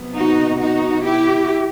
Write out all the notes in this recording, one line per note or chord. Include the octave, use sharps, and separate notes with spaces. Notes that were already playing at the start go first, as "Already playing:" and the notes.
Already playing: C3 F#3 B3
D#4 F#4
D#4 F#4
E4 G4